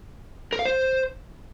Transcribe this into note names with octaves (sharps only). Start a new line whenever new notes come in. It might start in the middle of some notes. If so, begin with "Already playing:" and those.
A#4
F5
C5